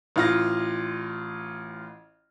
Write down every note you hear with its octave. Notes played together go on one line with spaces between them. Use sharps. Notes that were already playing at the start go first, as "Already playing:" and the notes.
A1 F4 A#6